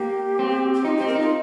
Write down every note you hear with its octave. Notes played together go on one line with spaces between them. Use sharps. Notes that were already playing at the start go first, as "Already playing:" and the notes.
Already playing: A#3 G4
C4
G4
D#4 F4
C4 G4
A#4
D#4 F4